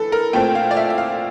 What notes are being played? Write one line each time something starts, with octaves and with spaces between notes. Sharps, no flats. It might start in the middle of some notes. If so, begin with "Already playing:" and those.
Already playing: E3 A4
A#4
A#2 A3 C4 G5
F5
D5
E5
E5
F5